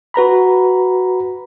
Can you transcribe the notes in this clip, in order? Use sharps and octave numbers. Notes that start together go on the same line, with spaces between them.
F#4 B4 A#5 B5